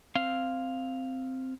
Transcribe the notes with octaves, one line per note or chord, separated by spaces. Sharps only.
C4 F5